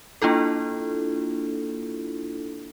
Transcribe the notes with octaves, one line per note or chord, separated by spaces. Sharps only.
A#3 D4 E4 F4 A4